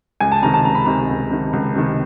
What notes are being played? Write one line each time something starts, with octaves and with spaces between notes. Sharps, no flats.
C#2 G#5
A5
C3 D#3 A#5
A5
C#2 A#5
B5
C3 D#3 A#5
C#2
C3 D#3
C#2
C3 D#3